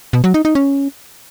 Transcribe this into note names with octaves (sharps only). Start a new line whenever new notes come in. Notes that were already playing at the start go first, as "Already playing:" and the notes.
B2
F#3
D#4
D#4
C#4